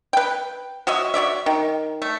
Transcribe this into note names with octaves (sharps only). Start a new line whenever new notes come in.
B4 G5
F#4 C#5 D#5 E5
F#4 C#5 D5 E5
D#3
A3